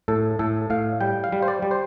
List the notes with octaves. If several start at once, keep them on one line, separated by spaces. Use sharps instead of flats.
A2 A4
A2 A4
A2 F5
G3 G5
F5
G3
C5
D5
G3
C5